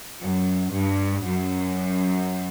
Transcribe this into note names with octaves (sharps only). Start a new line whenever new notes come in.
F#2
G2
F#2